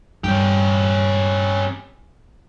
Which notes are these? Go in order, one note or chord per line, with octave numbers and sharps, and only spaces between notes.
G2 C#4 G4